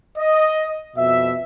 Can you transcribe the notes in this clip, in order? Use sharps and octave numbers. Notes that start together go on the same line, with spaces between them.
D#5
F2 B2 E5